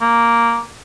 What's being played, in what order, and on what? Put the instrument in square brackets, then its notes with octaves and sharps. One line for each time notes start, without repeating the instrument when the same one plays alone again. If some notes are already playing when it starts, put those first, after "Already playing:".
[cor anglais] A#3